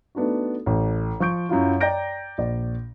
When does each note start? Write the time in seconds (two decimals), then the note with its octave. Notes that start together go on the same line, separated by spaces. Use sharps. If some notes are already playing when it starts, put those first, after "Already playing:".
0.15 A3 B3 D4 D#4 F#4
0.66 A1 A3
1.20 F3 C#6 G6 D7
1.49 F#2 F#3 E4 F4
1.81 D5 G5 A#5 G6 A#6 D7
2.38 A#1 D5